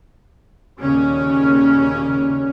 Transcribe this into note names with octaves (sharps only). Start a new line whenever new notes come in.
D#2 A#2 C#3 C#4